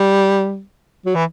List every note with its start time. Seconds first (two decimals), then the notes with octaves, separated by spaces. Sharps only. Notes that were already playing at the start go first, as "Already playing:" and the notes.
Already playing: G3
1.06 F#3
1.15 E3